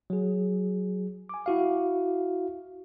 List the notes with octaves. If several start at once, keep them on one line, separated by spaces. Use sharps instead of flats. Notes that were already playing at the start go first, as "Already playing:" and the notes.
F#3 G#4
G#5 D6
E4 F#4 F5